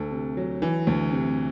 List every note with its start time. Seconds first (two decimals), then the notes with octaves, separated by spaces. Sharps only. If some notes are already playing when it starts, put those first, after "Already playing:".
Already playing: D2 A4
0.12 C3
0.37 F#3
0.62 E3
0.87 D2
1.13 C3